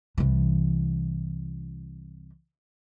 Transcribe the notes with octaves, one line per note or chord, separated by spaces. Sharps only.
C2 E3